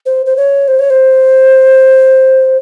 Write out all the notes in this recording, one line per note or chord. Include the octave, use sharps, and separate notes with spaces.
C5
C5
C#5
C5
C#5
C5